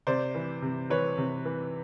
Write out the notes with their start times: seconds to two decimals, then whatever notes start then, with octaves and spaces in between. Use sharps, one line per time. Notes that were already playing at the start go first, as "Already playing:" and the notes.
0.07 C3 C5 D5
0.35 E3
0.62 C3
0.90 E3 B4 C#5
1.18 C3
1.45 E3